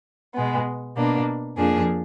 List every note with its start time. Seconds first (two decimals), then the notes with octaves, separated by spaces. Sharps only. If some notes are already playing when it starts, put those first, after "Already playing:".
0.34 B2 G#3 B3
0.97 B2 A#3 D4
1.57 F2 F3 A#3 D4 G#4